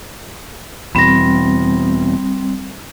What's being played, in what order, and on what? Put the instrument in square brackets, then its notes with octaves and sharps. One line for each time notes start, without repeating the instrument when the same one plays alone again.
[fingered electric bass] E2 B2 [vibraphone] G3 C4 [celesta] B5 A#6